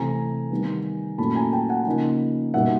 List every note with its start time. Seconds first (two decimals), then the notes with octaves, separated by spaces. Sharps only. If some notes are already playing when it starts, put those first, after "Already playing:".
Already playing: C3 E3 A3 C4 G#5 A#5
0.51 D#3 G3 B3
1.18 A#2 F#3 A3 C#4 E4 A5 B5
1.35 G#5 A#5
1.53 G5 A5
1.69 F#5 G#5
1.87 C#3 F3 A#3 D#4
2.54 B2 G3 A#3 D#4 E5 F#5